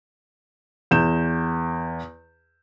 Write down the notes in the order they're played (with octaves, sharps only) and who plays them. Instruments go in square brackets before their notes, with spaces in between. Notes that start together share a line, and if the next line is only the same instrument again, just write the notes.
[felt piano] E2 G6 E7